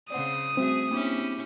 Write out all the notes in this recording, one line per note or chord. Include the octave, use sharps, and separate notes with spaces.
C#3 C4 D5 F#5 D#6
G3 A3 C4 F#4 G#4
A#3 C#4 D4 E4 G4 D6